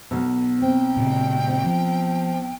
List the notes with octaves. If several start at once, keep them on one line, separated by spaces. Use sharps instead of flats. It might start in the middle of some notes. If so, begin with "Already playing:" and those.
B1 B3
C4 G5
A#2 C#3
C4
F3